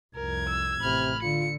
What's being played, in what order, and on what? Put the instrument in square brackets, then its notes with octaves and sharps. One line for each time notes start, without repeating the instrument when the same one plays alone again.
[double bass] C2 F2 [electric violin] A#4 [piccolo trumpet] G#6
[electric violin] E6
[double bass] A1 [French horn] C3 [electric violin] B5 F6
[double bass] D3 [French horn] F4 [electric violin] C#7